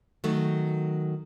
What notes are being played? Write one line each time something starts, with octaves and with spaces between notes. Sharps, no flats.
D#3 F#3 A3